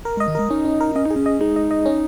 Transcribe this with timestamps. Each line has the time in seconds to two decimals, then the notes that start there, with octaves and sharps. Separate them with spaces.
0.05 A#4
0.17 G#3 D#5
0.28 D#3
0.35 G#3 A#4
0.50 C#4 D#4
0.65 C#4
0.81 A#4
0.96 C#4 D#5
1.06 D#4 G#4
1.16 C#4
1.26 D#5
1.41 G#3 D#4
1.56 D#5
1.71 D#5
1.86 C#4